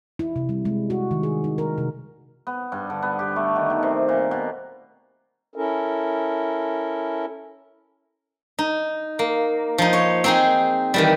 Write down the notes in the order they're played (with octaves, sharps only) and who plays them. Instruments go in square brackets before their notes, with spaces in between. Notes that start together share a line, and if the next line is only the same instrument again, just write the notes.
[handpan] E4
C3
G3
G#3
F#4
D#3
G#4
D#4
A#4
C3
[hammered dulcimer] B3
G2
D3
B3
G4
A3
D#3
B2
C3
A#2
B2
[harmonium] C#4 E4 A4 A#4
[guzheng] D#4
A#3
F3 D#4
C#5
C4 D#4 G#4
D#3 E3 G3